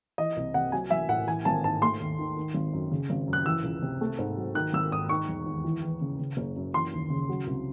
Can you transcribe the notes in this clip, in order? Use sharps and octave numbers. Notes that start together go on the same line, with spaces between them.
E3 D#5
C2
C3 F#5
F#3 G#5
A1 E5
A2 F#5
E3 G#5
G#1 A5
G#2 A5
A3 C6
D#2
D#3
D#3
G#1
F#2
C#3
G#1
F#2
F#6
E3 E6
C#2
C3
A3
G#2
F#3
D#3 F#6
G#1 E6
G#2 D#6
D#3 C#6
E1
D#2
E3
E2
C#3
C#3
F#1
F#2
E3 C6
D#2
C#3
F#3
C2